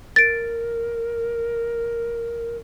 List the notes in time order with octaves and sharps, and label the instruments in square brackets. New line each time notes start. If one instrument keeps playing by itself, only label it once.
[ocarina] A#4 [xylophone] A6 D7